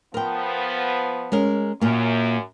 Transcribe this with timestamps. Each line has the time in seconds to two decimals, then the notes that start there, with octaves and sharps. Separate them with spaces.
0.14 F3 B3 A#4 G5
1.32 G#3 C#4 A#4
1.81 F#2 A#2 A#3